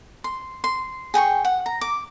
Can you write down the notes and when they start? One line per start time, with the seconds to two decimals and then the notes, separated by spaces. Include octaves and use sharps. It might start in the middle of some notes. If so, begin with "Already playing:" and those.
0.24 C6
0.64 C6
1.14 G#4 G5 B5 C#6
1.45 F#5
1.66 A#5
1.81 D6